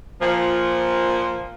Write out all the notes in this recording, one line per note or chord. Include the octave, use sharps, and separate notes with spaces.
A#2 F3